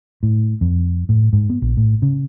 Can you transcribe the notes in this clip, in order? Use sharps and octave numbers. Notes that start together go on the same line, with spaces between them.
A2
F2
A2
G#2
B3
A#1
A2
C#3